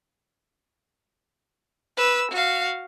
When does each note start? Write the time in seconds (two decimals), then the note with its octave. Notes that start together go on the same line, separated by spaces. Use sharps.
1.97 B4 E6
2.31 F#4 F5